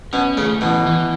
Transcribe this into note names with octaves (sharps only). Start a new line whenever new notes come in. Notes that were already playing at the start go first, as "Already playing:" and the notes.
B2 C#4
C#3 A3
B2 E3
E3